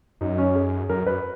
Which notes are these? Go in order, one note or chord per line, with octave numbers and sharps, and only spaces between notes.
F#2 D#4
C#4
G#4
F#2 A#4
F#2 B4